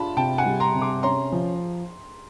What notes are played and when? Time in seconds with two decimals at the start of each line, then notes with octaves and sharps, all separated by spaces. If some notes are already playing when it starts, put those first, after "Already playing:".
Already playing: D4 F4 A5 B5
0.17 C3 G5 A5
0.38 F#5 G#5
0.46 G3
0.60 A#5 C6
0.74 C3
0.82 C6 D6
1.03 C#4 A#5 C6
1.32 F3